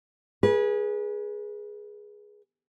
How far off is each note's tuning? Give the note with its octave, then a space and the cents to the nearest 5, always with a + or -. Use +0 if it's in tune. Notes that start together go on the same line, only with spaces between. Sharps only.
G#4 +0 B4 -30